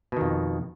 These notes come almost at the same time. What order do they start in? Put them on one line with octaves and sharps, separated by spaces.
B2 D#3 F2